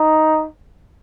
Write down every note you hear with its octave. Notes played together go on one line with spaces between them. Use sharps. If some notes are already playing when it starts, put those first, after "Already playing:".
Already playing: D#4